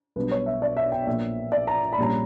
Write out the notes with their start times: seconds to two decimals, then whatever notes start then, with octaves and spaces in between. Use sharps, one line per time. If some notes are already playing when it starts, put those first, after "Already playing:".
0.16 B1 B2 G3 B3 D4 B4
0.32 C#5
0.46 E5
0.62 D5
0.77 E5
0.92 G5
1.07 A#1 A#2 A#3 E5
1.52 D5
1.67 A#5
1.93 B5
1.98 A#1 A#2 G3 C#4 A#5